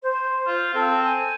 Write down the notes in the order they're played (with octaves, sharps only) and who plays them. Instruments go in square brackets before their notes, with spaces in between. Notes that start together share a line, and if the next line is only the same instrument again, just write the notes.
[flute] C5
[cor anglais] F4
[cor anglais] C4 [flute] A4
[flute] G#5